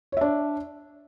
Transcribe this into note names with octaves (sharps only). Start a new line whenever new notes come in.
D4 C#5 E5